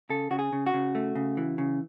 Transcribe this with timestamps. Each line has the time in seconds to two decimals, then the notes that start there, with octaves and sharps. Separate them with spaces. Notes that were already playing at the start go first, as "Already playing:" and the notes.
0.10 C#3 A4
0.31 C#3 F#4
0.39 G#4
0.53 C#3
0.66 F#4
0.74 C#3
0.95 A3
1.15 C#3
1.37 E3
1.58 C#3